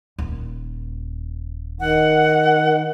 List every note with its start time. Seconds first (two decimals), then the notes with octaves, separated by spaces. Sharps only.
0.18 D#1 D#2
1.80 D#3 F#5